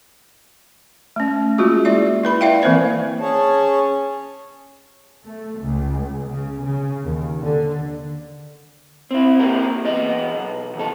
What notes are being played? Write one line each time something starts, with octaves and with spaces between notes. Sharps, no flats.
A3 C#4
G#3 A#3 F4 F#4 G#4
E4 D5 E5
E4 B4 B5
E4 D5 E5 F5 G5
E3 A#3 C4 A#4 C5 D5
C#4 G#4 C#5 A5
A3
C#2
C#3
C#3
D#2
D3
C4 E4
A#3 C4 G4 A#4
E2 B3 D#5
B1
D#2 G#2 A4